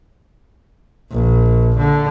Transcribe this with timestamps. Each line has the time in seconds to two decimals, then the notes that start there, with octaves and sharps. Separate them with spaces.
1.11 A#1
1.78 D3